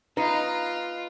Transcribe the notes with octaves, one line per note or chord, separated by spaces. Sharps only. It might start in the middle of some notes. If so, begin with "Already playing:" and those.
D#4 F4 B4 D#5